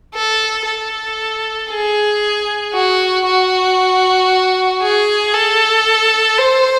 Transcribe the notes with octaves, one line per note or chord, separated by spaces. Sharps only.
A4
A4
G#4
F#4
F#4
G#4
A4
C5